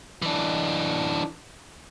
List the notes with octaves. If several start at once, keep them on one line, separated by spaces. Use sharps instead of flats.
E3 D4